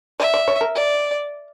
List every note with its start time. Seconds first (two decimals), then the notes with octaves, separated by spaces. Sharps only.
0.20 D5 E5
0.34 D5
0.48 C#5
0.61 A#4
0.75 D5